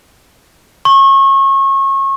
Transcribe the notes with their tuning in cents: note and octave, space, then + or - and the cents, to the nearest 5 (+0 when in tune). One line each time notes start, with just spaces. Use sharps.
C#6 -30